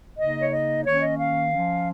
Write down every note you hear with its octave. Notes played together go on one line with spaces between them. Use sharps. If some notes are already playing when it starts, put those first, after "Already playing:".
C#3 A#3 D#4 D#5
C#5
D#5
D#3 A#3 C#4 C#5
D#5
F5
F3 C#4